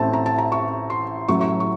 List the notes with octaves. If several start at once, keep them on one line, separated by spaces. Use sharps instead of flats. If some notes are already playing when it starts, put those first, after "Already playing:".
Already playing: A1 A2 A3 C4 A5
A#5
A5
A#5
C#6
C6
A1 A2 F#3 A3 C#6
C#6
C#6